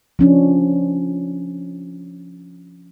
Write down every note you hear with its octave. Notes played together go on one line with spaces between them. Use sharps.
F3 C#4 D4